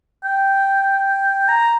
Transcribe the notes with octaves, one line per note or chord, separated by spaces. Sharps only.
G5
A#5